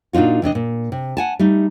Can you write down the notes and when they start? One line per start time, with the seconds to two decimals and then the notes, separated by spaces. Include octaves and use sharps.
0.13 A#2 D4 D#4 F4 F#4
0.42 E2 C3 D4 D#5
0.55 A#2
0.92 C3
1.17 F#5 G#5 A5
1.39 G3 A3 D#4